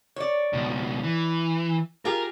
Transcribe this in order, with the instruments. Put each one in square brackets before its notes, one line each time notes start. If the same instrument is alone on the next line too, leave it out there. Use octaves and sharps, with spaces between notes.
[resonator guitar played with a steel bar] C#5 D5
[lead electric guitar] C#2 B2
E3
[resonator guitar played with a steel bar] F4 G4 G#4 [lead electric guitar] A#4